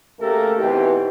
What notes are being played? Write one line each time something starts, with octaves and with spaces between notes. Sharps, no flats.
C#3 A3 A#3 G4 A4 A#4
B2 E3 C4 D#4 F#4 G4